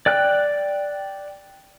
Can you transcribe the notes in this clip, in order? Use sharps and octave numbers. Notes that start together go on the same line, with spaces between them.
D5 G5 F#6